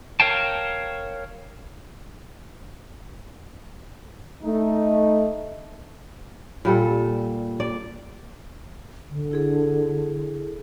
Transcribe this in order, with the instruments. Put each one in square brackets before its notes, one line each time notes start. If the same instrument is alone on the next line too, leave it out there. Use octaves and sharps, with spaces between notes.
[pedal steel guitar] A#4 C#5 F5 G5 A5
[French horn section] A3 D#4
[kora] A#2 G3 A4
D5
[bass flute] D3
[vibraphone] E4 G#4 A4